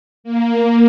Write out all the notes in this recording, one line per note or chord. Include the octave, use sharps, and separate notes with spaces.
A#3